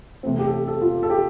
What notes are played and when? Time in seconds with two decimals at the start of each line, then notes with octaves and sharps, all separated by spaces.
0.23 C3 E3 A3 C4
0.39 G4
0.47 A4
0.53 G4
0.68 A4
0.81 F4
1.03 A4
1.10 G4